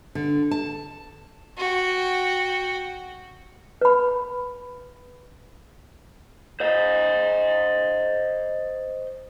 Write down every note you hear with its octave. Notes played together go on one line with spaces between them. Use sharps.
D3
A5
F#4 G5
B4 B5
C5 D#5